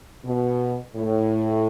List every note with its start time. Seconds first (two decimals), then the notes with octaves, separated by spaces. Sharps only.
0.25 B2
0.96 A2